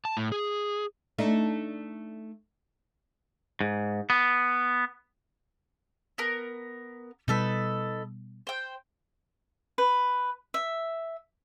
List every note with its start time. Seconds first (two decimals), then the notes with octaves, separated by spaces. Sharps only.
0.05 A5
0.17 A2
0.32 G#4
1.18 A3 D4 D#4
3.61 G#2
4.10 B3
6.18 B3 A#4
7.28 B2 G3 D#4 A4 B4
8.47 C5 G5
9.78 B4
10.54 E5